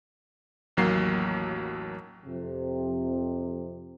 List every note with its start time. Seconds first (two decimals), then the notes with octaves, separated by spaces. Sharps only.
0.77 A1 D#2 F#3 A#3 C7
2.26 F2 C3